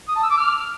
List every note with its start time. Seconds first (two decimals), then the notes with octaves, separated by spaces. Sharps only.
0.08 D#6
0.16 A5
0.23 E6
0.30 D6
0.38 F6